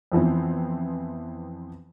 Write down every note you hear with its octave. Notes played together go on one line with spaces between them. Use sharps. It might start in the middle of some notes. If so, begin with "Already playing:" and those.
F2 E3 B3 C4